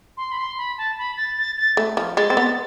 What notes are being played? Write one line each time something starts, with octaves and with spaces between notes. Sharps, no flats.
C6
B5
C6
B5
A5
B5
A6
A6
A6
A3
F3
G#3 A6
C4
B3